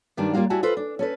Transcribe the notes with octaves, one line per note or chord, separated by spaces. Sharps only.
G2 D#3 G3 D4 B4
G3 A#3 F4 F#4 F5
G3 E4 F#4 G#5 A5
F4 A4 B4 C5
D4
C#4 A4 B4